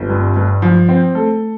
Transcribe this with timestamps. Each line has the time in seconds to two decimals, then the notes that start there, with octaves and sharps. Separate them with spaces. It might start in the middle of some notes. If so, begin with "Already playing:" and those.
Already playing: G1 C4 D4 F4 G4
0.09 G2
0.36 G2
0.62 F3
0.89 C4
1.15 A3 A4